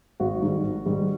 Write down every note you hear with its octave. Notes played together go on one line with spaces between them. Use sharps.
G#1 F#4
G#2 D#3 G3
G#1
G#2 D#3 G3